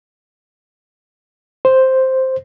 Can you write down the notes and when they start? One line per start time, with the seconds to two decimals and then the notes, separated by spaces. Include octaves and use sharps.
1.65 C5